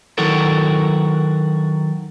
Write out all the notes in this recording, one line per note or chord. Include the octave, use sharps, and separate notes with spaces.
D#3 F#3 E4 F#4 A4 A#4